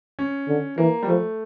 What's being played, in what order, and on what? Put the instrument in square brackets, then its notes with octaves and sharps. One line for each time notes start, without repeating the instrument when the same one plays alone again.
[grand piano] C#4
[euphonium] D3
[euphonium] E3 [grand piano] A#3
[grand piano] G3
[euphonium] F3 [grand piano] A3